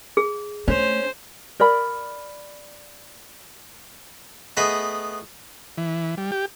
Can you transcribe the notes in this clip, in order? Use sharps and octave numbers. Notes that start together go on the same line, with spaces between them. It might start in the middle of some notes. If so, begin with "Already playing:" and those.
G#4
A3 C#4 C5
A#4 D5 B5
A3 B3 G#4 D#5 B5
E3
G3
G4